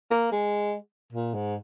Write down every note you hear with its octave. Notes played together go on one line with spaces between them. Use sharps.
A#3
G#3
A#2
G#2